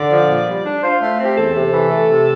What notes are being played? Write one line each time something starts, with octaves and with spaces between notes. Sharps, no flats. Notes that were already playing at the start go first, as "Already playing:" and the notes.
Already playing: D3 D5
F3
A#2
G3
D4
F4 C5
A3
C4 G4
E2 A4
C3
E3
A3
C3